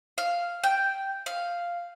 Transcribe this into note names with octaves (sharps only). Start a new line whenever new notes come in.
F5
G5
F5